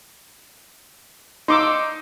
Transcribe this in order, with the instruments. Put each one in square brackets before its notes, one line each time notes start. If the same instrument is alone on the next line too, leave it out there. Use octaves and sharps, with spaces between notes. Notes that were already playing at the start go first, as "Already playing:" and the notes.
[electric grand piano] D#4 [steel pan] C6 D6 E6